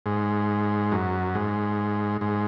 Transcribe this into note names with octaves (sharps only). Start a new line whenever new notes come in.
G#2
F#2
G#2
G#2